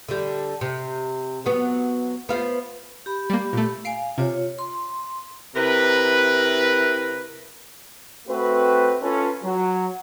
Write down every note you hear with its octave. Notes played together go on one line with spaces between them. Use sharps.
D3 G3
C3
F#3 B3
B3 F4 C5
G4 B5
G3 A#3
A#2 A3
F5 G#5 C7 D7
C3 F4 C#5
C6
C3 E4 A#4 B4
A3 C4 F#4 B4
C#4 F4 A4 B4
F#3